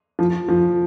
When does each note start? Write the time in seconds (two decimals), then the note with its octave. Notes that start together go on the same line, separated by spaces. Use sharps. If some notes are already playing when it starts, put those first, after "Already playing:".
0.19 F3
0.49 F3